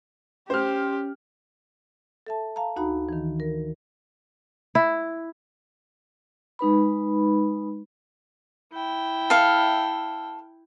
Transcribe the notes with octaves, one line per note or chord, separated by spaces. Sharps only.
C#4 G4 C5 F6
A4 E5 A5
F5 A5 A#5
D2 D#4 F#4 A#5 B5
D#3 E3
A#4
E4
G#3 D#4 B4 B5
E4 G5
A4 E5 F5